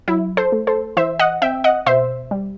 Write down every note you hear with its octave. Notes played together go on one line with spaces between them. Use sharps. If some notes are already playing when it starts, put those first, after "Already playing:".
F#3 E4
A4 C5
A3
A4 C5
E3 C5 E5
D#5 F#5
C4 E5 G5
D#5 F#5
B2 C5 E5
G3